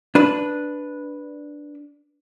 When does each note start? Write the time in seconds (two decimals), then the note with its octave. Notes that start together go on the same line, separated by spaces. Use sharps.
0.15 D4 B4